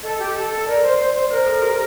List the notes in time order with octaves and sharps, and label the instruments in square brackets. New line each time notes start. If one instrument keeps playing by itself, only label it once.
[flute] A4 [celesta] D#5
[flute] G4
A4
A4
[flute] A#4 [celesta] D5
[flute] C5
C5
C5
[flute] A#4 [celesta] C5
[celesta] A4
G4